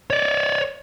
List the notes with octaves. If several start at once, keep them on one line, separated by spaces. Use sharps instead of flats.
C#5 D5